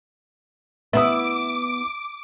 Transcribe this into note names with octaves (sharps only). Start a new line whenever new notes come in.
B3 E4 E5 D6 D#6